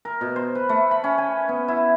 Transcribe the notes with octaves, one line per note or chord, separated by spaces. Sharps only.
A#4
B2
C5
B4
A3
B5
C#4
G#5
B3
E4